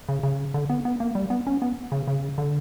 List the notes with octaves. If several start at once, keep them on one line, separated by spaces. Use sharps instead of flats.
C#3
C#3
D3
B3
B3
A#3
G3
B3
C#4
B3
C#3
C#3
D3